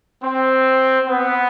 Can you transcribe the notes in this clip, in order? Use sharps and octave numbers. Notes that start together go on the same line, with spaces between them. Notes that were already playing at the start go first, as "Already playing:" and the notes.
C4
B3